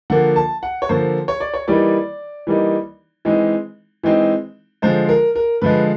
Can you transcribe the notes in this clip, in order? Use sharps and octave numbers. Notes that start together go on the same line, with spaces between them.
D3 F3 A#3 F#5
A5
F#5
C#5
D3 F3 A#3 C5
C#5
D5
C#5
E3 G3 A#3 D#4 D5
E3 G3 A#3 D#4
E3 G#3 C4 D#4
E3 G#3 C4 D#4
D3 F3 G#3 C5
A#4
A#4
D3 F3 G#3 B4